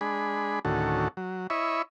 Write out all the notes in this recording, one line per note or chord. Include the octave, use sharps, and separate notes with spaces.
G#3 D4 G#4 B5
D2 A2 D#3 C#4 F#4 A4
F#3
E4 C#5 D#5 E5 B5 C#6